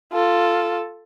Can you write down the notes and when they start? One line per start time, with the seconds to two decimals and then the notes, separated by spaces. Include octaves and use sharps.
0.13 F4 A4